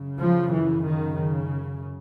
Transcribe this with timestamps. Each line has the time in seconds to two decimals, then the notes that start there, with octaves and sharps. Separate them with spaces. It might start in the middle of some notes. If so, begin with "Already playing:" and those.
Already playing: F#2 C#3
0.20 F3
0.52 E3
0.85 D#3
1.15 C#3